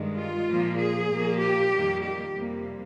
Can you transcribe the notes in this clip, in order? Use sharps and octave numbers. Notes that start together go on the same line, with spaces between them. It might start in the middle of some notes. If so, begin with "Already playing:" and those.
Already playing: G2 D#3 G#3
F4
A#2 F3 A#3
G#4
A#2 F3 A#3
G4
F2 D#3 G3 A#3
G4
F2 C3 G3 A#3